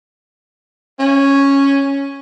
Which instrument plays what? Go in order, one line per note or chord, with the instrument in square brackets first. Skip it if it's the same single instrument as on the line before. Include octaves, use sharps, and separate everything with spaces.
[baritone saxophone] C#4